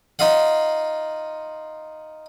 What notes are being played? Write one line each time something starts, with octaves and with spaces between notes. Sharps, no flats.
D#4 F4 D#5 F5 F#5